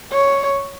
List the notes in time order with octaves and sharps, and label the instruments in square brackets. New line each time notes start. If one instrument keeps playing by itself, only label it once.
[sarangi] C#5